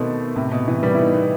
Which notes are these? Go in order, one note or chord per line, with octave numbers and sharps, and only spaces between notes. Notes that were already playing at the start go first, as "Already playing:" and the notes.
Already playing: B2 D#3 A3 B3 C4 D#4
A2 C3
B2
C3 E3
G3 B3
E4
B3 D#4
B3 D#4